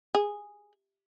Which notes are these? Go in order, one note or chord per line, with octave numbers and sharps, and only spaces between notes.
G#4